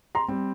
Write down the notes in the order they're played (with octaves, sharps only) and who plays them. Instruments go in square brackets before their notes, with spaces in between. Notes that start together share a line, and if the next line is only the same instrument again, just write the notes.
[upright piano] A#5 C6
[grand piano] G3 C4